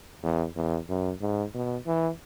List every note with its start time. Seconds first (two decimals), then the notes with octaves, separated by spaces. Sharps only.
0.23 E2
0.56 E2
0.89 F#2
1.21 G#2
1.54 B2
1.86 E3